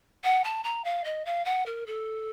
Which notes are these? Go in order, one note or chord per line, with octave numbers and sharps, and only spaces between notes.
F#5
A5
A#5
F5
D#5
F5
F#5
A#4
A4